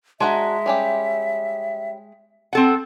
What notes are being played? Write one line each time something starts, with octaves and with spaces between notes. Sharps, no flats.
G#3 D4 F#4 E5 A#5
G3 C#4 G4
C4 A4 F#5